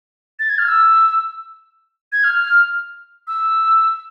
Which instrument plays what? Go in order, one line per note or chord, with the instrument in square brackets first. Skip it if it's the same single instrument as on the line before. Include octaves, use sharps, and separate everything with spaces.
[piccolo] A6
G#6
F6
E6
G#6
F6
E6